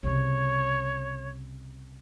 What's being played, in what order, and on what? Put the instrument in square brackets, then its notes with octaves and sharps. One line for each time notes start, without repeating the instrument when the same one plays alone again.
[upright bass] C2 C#3 [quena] C#5